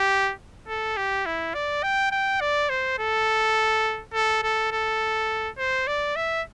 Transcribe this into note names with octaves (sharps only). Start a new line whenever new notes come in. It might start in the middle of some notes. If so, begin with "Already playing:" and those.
Already playing: G4
A4
G4
E4
D5
G5
G5
D5
C5
A4
A4
A4
A4
C5
D5
E5